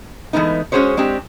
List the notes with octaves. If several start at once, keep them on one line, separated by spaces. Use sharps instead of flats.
E3 G#3 A3 B3 D#4
G#3 C#4 F#4 G#4 C5 C#5
G#3 C4 D4 G4